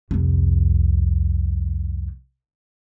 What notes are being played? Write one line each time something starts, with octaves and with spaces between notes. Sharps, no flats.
C2 F2